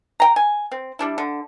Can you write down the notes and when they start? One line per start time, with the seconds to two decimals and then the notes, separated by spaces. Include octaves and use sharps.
0.20 G5 A#5
0.36 G#5
0.72 C4
0.99 G3 D4 E4
1.18 D3